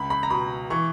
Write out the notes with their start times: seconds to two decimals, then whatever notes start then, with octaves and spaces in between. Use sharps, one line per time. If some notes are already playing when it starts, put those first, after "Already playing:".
Already playing: C#2 B5
0.10 B5
0.23 A#5
0.30 B2 B5
0.70 E3 C#6